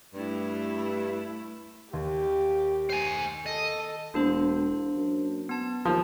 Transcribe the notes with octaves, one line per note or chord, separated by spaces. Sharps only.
G2 A3 E4
D#2 G4
C5 G#5
A4 D#5
E1 A#3 D4 C5
F#2
B3 A5
D#2 F3